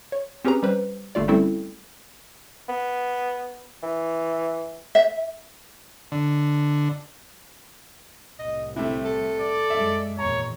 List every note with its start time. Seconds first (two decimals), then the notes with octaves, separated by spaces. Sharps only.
0.12 C#5
0.45 C4 C#4 G4 G#4 B4 A#5
0.63 G3 B4 C5
1.15 G1 A3 F4 D5
1.28 G3 A3 C4 C#4 E4 A4
2.69 B3
3.83 E3
4.95 E5
6.12 D3
8.39 C2 A2 D#5
8.76 C3 A3 E4
9.05 A4
9.39 D5
9.70 F#2 G#3 E5
10.19 G#1 E2 A#2 C#5 A#5